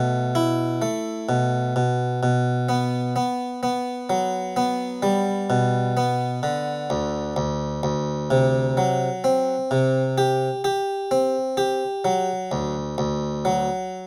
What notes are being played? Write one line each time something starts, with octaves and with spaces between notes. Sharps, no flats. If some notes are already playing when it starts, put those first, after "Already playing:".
Already playing: B2 A3
E4
A3
B2
B2
B2
B3
B3
B3
F#3
B3
G3
B2
B3
D3
D2
D2
D2
C3
F#3
C4
C3
G4
G4
C4
G4
F#3
D2
D2
F#3